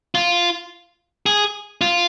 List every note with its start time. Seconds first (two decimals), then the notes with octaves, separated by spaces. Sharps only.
0.15 F4
1.26 G#4
1.81 F4